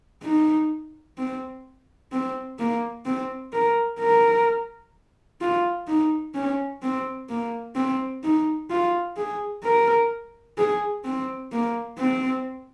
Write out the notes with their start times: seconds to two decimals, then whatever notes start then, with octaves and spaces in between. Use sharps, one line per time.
0.23 D#4
1.18 C4
2.12 C4
2.59 A#3
3.06 C4
3.53 A#4
4.00 A#4
5.41 F4
5.87 D#4
6.35 C#4
6.82 C4
7.29 A#3
7.76 C4
8.24 D#4
8.70 F4
9.17 G#4
9.64 A#4
10.58 G#4
11.05 C4
11.52 A#3
11.99 C4